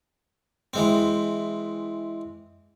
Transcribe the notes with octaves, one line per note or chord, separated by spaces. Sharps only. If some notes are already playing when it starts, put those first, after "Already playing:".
E3 G#3 C4